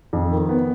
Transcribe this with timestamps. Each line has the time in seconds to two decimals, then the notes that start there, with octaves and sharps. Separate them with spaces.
0.13 F2
0.31 D#3
0.49 B3